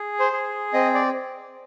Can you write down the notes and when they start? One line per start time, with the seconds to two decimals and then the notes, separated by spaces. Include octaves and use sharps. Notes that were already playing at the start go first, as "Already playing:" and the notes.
Already playing: G#4
0.20 C5
0.33 G#4
0.73 C4 D#5
0.94 D5